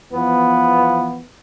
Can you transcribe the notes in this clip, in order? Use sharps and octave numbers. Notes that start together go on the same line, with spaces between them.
E2 E3 F3 B3